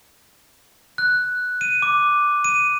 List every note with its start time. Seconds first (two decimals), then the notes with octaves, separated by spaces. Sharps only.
0.98 F#6
1.61 D#7
1.82 D6
2.44 D#7